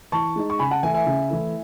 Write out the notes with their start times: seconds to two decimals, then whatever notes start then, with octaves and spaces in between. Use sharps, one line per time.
0.12 E3 A5 C#6
0.36 G#3 D#4
0.50 C#6
0.59 C#3 G#5 B5
0.71 F#5 A5
0.83 E3 A3 E4 E5 G#5
0.94 E5 G#5
1.06 C#3
1.30 E3 A3 E4